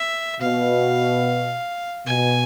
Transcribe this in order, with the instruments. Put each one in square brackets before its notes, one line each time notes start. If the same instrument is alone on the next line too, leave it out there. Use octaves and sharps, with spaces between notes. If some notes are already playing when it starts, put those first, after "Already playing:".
Already playing: [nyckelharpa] E5
[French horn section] B2 [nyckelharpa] F5
[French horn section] B2 [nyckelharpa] G#5